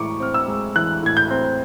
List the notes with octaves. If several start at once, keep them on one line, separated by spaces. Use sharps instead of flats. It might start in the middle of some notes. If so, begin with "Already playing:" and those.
Already playing: A2 E3 G#3 C#6 D6
C4 F6
E6
G#3
E3 F#6
A2 G#6
G6
C4